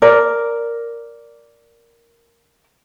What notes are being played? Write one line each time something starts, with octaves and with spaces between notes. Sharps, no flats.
A#4 D5